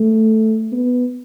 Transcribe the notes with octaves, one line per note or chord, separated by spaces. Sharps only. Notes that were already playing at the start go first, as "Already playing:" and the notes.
Already playing: A3
B3